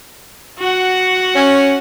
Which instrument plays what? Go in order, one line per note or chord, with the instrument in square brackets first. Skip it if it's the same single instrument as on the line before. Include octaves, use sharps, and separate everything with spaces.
[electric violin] F#4 F#5
[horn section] C#4